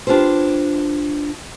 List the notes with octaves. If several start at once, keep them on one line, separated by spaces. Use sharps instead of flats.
D4 F4 G4 B4 C5